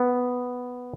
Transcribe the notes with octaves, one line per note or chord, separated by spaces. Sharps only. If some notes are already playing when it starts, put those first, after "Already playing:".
Already playing: B3